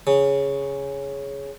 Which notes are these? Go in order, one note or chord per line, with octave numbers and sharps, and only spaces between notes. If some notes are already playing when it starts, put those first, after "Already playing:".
C#3